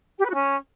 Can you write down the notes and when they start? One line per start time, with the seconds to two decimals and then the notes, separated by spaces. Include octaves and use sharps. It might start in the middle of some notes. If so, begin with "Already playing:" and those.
0.18 G4
0.24 B4
0.29 F#4
0.34 C#4